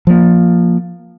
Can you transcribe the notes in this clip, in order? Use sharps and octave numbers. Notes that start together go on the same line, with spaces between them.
F3 A#3